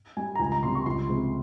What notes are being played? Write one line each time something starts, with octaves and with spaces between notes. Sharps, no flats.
G3 G#5
A#5
C#2 G#5
A#5
C3 G3 C6
C#6
C#2 C6
C3 F3 G#3